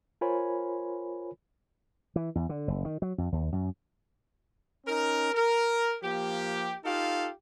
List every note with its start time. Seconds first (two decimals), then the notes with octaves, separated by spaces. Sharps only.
0.21 F4 A#4 C5 C#5 G#5 B5
2.16 E3
2.35 E2
2.49 D3
2.68 F#1
2.85 D#3
3.02 F#3
3.18 F2
3.32 D#2
3.53 F#2
4.86 C#4 D#4 A#4
5.34 A#4
6.03 F3 A#3 G4
6.84 D#4 F4 G4 A4 F5